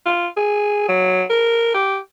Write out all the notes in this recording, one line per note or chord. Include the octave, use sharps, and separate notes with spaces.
F4
G#4
F#3
A#4
G4